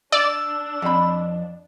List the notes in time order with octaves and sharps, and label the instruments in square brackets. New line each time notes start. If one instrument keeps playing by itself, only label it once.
[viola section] D4 [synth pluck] D5 [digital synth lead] E6
[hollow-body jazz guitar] F2 B5